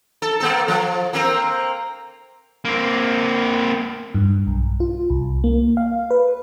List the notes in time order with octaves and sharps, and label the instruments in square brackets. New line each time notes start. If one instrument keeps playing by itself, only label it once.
[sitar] A4
A#3 B3 A4
F3
A#3 C4 A#4
[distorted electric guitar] A#3 C4
[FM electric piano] G2
B1
F4
C2
A#3
F5
B4